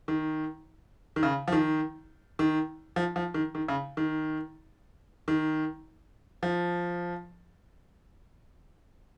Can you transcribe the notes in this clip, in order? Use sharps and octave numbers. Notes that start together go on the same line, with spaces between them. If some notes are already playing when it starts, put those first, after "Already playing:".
D#3
D#3
C#3
F3
D#3
D#3
F3
F3
D#3
D#3
C#3
D#3
D#3
F3